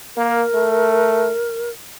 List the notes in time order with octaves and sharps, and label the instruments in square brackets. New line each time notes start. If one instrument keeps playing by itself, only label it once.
[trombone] A#3 [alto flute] A#4
[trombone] A3